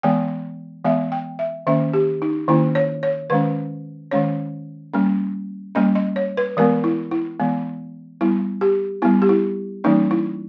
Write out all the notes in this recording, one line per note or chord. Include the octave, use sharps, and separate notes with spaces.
E3 G#3 B3 G5
E3 G#3 B3 E5
G5
E5
D#3 A#3 C#4 E5
G4
D#4
D#3 A#3 C#4 E4
C#5
C#5
D#3 G#3 C#4 B4
D#3 G#3 C#4 C#5
G3 A#3 C#4
G3 A#3 C#4 D#5
D#5
C#5
B4
E3 G#3 B3 A#4
E4
E4
E3 G#3 B3
G3 B3 E4
G4
G3 B3 E4
G4
E4
E3 G3 A#3 C#4 D#4
E4